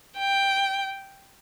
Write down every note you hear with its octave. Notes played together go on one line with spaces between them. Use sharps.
G5